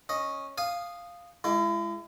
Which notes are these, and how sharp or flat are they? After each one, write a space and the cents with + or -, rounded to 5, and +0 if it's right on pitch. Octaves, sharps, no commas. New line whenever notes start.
C#4 -10 D#5 +0
F5 +0 G#5 +0 D#6 -10
G#3 +0 E4 +40